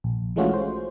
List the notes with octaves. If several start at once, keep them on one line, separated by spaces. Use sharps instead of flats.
A#1
E3 G#3 A3 C#4 F4 F#4
C5